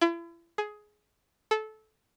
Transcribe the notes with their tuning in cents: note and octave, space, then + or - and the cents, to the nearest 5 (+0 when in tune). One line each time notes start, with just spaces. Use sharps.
E4 +40
G#4 +15
A4 -20